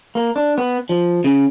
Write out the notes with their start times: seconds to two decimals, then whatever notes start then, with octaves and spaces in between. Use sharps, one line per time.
0.15 A#3
0.36 D4
0.58 B3
0.89 F3
1.24 C#3